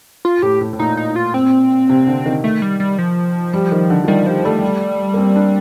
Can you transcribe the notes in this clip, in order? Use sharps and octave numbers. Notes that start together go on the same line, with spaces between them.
F4
A2 G4
A2
A2
A#2 D#4
D#4
F4
C4
C3
D3
D#3
A3
G3
G3
F3
G3
D#3
D3
F3
D#3 G3
F3 G3
G3 A3
A#3
C4
D4